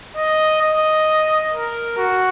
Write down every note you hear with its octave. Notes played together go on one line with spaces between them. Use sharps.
D#5
D#5
A#4
F#4